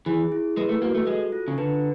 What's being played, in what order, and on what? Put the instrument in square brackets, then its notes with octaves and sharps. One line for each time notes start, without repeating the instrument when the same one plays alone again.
[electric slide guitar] E3 [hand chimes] G#4
[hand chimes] E4
[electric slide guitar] G#3 [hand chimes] B4
[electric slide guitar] A3
[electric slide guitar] A#3 [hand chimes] F#4
[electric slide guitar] A3
[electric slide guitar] G#3 [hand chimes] A4
[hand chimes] F4
[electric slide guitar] C#3
[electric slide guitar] D3 [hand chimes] B4